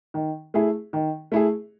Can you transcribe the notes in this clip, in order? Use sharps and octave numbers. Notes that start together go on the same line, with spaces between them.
D#3
A3 E4 G#4
D#3
A3 E4 G#4